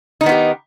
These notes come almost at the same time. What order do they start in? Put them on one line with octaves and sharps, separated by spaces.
D#4 D#3 B3 F4 G4